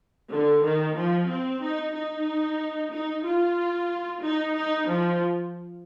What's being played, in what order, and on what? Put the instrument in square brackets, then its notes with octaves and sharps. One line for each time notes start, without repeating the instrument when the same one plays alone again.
[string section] D3
D#3
F3
C4
D#4
D#4
D#4
F4
D#4
D#4
F3